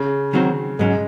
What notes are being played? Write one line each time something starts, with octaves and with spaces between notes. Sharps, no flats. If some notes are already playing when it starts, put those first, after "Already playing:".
Already playing: C#3
D#3 F#3 C4 F#4 C5
G#2 F#3 G#3 C#4